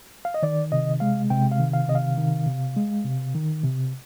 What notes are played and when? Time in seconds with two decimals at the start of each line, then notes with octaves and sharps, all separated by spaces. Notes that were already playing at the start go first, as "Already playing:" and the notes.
0.25 F5
0.34 D#5
0.43 D#3 D5
0.72 C3 D#5
1.00 G#3 F5
1.30 C3 G5
1.52 F5
1.59 D#3
1.74 F5
1.88 C3 D#5
1.95 F5
2.18 D#3
2.46 C3
2.76 G#3
3.04 C3
3.35 D#3
3.63 C3